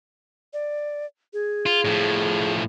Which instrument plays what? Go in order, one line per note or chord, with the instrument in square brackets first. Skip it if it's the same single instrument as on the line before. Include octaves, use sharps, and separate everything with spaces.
[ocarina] D5
G#4
[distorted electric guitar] F4
A2 F3